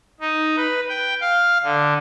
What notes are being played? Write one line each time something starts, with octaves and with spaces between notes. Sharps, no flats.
D#4
B4
G5
F5
D3